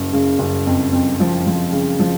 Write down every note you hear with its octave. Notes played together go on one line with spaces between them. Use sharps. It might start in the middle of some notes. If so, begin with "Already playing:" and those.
Already playing: F#1
C#3
F#1
F2
F2
F3
F3
C#3
F3